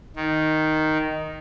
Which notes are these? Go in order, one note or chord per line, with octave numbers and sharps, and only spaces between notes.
D#3